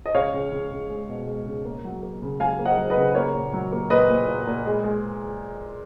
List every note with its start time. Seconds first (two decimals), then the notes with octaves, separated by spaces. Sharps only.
0.06 D#5
0.14 C#2 C#5 F5
0.34 C#2
0.52 C#2
0.72 C#2
0.89 G#3
1.09 B2
1.27 G#3
1.46 C#2
1.65 A#3
1.84 F#3
2.03 A#3
2.22 C#3
2.40 F#3 F5 G#5
2.59 A#3
2.65 D#5 F#5
2.78 F#3
2.90 B4 D#5
2.97 C#3
3.15 A#3 A#4 C#5
3.34 A#2
3.53 F#3
3.72 A#3
3.90 A#2 B4 D#5
4.09 A#2
4.28 A#2
4.47 A#2
4.65 G#3
4.84 G#3